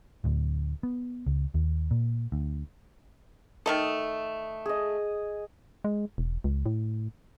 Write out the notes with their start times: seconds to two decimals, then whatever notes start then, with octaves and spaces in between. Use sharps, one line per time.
0.24 D1 D2
0.83 B3
1.26 C#2
1.54 D#2
1.91 A#2
2.32 D2
3.66 D#3 A3 A4 D#6
4.66 G#4 D#5
5.84 G#3
6.18 E1
6.44 C#2
6.66 A2